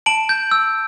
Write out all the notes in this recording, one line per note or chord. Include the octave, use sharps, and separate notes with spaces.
A5 D7 F#7
G6
E6